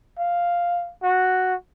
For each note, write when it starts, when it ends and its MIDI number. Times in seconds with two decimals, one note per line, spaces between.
0.19 0.92 77
1.03 1.54 66